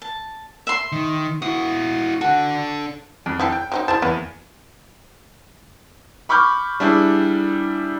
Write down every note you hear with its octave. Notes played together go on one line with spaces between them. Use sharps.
A5
E5 C6
D#3
E4 F#4 D#6
D4 F#4 A4
F2
E4 G4 A4
G5
F#3 C4 D#4
E4 G#4 C5 A5
E2 A#3 B3
B5 C#6 D6 F6 G6
G3 D4 E4 G#4